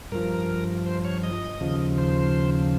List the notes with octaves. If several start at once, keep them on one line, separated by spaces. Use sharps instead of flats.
G2 F3 A#4
C5
C#5
D#5
D#2 C#3 F3
C5